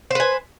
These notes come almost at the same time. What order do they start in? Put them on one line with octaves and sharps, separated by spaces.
C5 B4 G#5